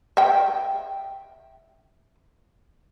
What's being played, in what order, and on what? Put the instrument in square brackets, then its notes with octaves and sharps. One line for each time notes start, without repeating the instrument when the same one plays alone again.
[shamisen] E5 G5